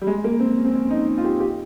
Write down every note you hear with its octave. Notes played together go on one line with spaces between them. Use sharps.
G3
G#3
A#3
C4
C#4
C4
C#4
D#4
F4
G4
G4